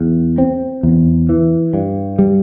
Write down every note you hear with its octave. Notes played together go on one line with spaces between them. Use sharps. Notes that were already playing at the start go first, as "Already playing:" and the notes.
Already playing: E2
C4
E2
E3
G2
G3